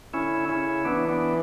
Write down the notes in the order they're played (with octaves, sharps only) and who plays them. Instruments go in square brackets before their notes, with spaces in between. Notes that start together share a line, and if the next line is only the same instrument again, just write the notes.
[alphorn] D3 [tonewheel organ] C#4 E4
[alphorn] C#3 [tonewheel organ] C#4 E4
[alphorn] E3 [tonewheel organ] B3 D4
[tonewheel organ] B3 D4